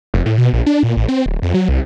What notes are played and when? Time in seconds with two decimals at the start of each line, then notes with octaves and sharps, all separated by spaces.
0.14 F1
0.26 A2
0.38 B2
0.53 A#1
0.66 D4
0.83 A#2
0.97 A1
1.08 C4
1.26 D1
1.42 F2
1.54 F#3
1.69 C2